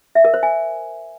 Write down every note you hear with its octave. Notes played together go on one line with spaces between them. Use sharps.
E5
A#4
C5
G#5